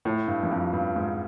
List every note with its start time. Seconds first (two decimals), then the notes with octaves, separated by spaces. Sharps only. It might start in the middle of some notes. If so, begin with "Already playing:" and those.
0.05 A2
0.28 G2
0.43 F#2
0.51 F2
0.73 G2
0.96 G#2